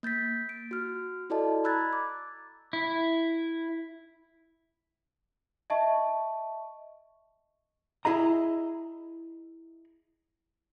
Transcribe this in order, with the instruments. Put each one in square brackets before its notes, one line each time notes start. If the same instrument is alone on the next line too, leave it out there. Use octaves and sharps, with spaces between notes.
[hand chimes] A#3 G6 A6 B6
D7
F#4 F6
E4 F#4 A4 D5 D#5 A5
A#5 B5 E6 F#6 G#6 A6
D6
[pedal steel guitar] E4
[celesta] D#5 E5 A5 C#6
[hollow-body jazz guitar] E4 G#4 D#5 A#5